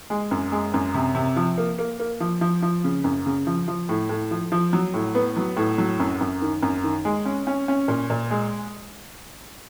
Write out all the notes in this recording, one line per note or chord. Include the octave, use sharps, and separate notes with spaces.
G#3
F#2
G#3
F#2
C3
C3
F3
A#3
A#3
A#3
F3
F3
F3
C#3
F#2
C#3
F3
F3
A2
A2
F3
F3
F#3
A2
B3
F#3
A2
F#3
F#2
F#2
D#3
F#2
D#3
G#3
C#4
C#4
C#4
A#2
A#2
G#3